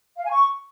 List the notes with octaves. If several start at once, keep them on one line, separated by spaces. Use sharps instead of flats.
F5
G#5
C#6